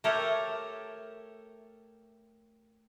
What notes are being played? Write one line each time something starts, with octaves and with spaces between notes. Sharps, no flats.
A3 G4 A4 A#4 C#5